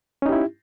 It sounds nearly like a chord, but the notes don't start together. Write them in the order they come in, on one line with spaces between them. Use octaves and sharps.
C#4 D#4 G4 E4